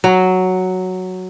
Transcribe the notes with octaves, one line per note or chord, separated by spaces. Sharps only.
F#3